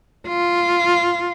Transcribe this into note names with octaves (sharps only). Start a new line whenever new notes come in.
F4